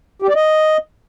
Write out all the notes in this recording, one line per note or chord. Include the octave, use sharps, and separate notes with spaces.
G4
D5
D#5